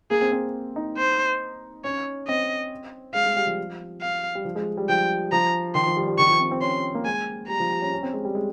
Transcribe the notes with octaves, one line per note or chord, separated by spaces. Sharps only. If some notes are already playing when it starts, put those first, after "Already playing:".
A#3 G#4
C4
C4
D#4
C5
C#4 C#5
C4 D#5
G#3 F5
G#3
G3
F3
F5
G3
F3
G#3
G3
F3 G5
F3 A#5
D#3 C6
F3
G3
G3
D#3 C#6
F3
C4
C4
C#4 C6
A#3
G#3 G#5
G3 A#5
F3
G3
C#4
C#4
C4
G#3
G3
G#3